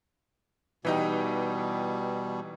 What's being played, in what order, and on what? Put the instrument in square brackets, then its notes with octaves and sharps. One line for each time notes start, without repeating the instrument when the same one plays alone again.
[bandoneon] B2 G3 [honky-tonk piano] E3 D#4 G4